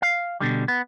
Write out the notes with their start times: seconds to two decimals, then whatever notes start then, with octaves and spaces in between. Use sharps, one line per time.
0.02 F5
0.40 B2 D3 G3
0.68 B3